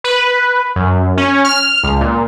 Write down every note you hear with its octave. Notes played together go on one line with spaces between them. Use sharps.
B4
F#2
C#4
F6
C#2
A#2